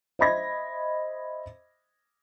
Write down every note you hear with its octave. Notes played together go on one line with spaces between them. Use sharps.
C5 D#5 E5 B5 G#6 A#6